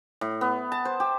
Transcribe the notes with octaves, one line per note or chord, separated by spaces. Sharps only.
A2
B3
A5
C5
G4